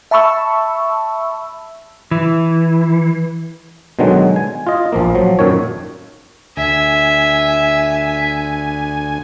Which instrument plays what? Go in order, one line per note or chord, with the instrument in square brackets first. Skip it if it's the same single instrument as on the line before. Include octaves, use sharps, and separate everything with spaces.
[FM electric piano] E5 A5 B5 C#6 E6
[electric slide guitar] E3
[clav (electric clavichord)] B2 D3 D#3 F#3 G#3
G#5
F4 D#5
A#1 F3 A#3
F3 F#3
F#2 A#2 D#3 C#5
[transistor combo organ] D2 G#5 [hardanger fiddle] E5